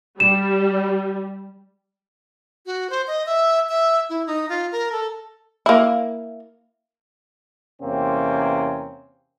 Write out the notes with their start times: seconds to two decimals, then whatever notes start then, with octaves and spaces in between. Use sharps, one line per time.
0.20 G3 E7
2.66 F#4
2.90 C5
3.07 D#5
3.26 E5
3.69 E5
4.10 E4
4.27 D#4
4.49 F4
4.72 A#4
4.92 A4
5.66 A#3 E4
7.81 E2 C3 A#3 C4 C#4